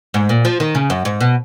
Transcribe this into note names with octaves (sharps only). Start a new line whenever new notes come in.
G#2
A#2
F3
D#3
C#3
F#2
G#2
B2